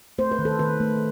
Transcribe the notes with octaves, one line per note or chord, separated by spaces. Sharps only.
A3 C5
B4
D#3
A4
D#3 B4
A3